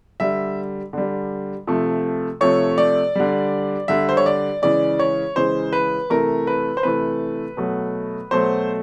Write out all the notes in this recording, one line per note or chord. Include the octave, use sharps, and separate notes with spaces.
D3 G3 E5
D3 G3
C3 F3 A3
C3 F3 A3 C#5
D5
D3 G3
D3 G3 E5
C5
C#5
D5
C#3 E3 G#3 D5
C#5
C#3 E3 G#3 C5
B4
C3 E3 A3 A#4
B4
C5
C3 E3 A3 B4
B2 F#3 A3
B2 F#3 A3 C5